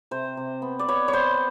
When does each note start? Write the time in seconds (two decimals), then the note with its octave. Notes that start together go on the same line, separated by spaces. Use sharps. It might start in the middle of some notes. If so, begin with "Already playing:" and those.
0.11 C3 C5
0.37 C3
0.62 B3
0.79 D5
0.88 B3 C#5
1.08 C#5
1.13 B3 C5